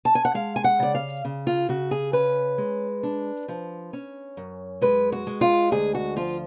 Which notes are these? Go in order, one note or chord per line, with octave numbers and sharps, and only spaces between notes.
A5
G#5
F#5
G#3 F5
G#5
F#5
C#3 D5
F5
C#3
F4
C#3 F#4
G#4
C#4 B4
G#3
D4
F3
C#4
F#2
G#3 B4
F#4
G#3
F4
D2 G#4
F#4
F3 F4